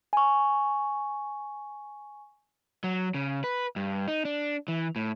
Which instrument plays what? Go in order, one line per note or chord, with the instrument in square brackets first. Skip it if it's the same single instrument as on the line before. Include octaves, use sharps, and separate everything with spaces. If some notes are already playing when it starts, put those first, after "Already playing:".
[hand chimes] G#5 C#6
[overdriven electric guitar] F#3
C#3
B4
G2
D#4
D4
E3
A2